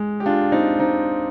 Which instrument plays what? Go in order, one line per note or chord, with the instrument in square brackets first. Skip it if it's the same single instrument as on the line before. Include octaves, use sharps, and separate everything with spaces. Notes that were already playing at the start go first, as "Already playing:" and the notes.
Already playing: [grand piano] G#3
G4
D4 F4
C4 D#4
C4 D#4